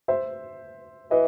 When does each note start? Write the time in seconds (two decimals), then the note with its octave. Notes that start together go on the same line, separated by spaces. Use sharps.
0.08 C5 E5
1.11 E3 B4 D#5